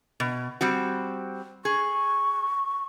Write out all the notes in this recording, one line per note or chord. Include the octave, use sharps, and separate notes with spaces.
B2
G3 C4 F#4
G#4 C#6